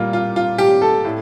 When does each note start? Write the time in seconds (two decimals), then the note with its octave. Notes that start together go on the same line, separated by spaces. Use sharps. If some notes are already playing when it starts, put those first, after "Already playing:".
Already playing: A#2 G3 A#3 F4
0.13 F4
0.36 F4
0.58 G4
0.82 A4
1.05 A2